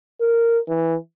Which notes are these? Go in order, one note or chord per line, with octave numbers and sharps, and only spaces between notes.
A#4
E3